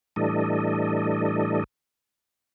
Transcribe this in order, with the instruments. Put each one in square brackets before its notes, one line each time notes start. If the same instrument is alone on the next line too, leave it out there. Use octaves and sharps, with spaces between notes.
[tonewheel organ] A2 E3 G3 D4 A4 D#5